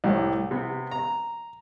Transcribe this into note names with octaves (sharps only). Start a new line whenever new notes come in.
C2 A2 G4
C3 B3
A#5